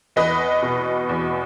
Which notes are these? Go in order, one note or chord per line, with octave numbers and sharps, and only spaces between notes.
E2 B4 D#5
B2
E2